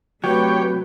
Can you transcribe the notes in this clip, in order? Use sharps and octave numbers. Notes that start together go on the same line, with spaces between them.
C3 F#3 G3 A3 G4 B4 C#5 G5